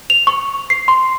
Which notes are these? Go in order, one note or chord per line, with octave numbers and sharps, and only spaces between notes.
F7
C#6
C7
C6